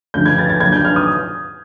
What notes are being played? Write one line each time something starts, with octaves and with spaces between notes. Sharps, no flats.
D2 C#3 F3 G6
G#6
A6
A6
D#2 D3 F#3 G#6
G6
F6
D#6